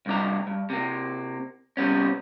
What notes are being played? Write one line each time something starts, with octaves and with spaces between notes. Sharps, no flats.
C2 G2 D4 A#5
G2
C3 A#3
C3 G3 B3 C#4